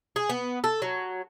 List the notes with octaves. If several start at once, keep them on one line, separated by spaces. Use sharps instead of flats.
G#4
B3
A4
F#3